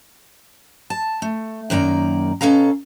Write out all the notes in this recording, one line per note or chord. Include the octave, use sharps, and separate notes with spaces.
A5
A3
F#2 D#3 A#3 D5 A#5
B2 A#3 C#4 A4 F5 A#5